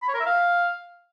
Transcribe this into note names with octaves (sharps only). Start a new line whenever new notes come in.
B5
C#5
A#4
E5
F5